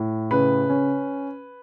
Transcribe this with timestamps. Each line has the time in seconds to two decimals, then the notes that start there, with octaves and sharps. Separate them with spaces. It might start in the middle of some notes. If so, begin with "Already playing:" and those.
Already playing: A2
0.31 C#3 B4
0.70 C#4